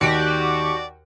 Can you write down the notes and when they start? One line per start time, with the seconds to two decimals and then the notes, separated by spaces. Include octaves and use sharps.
0.01 D#2 F#4 G4 D5 D7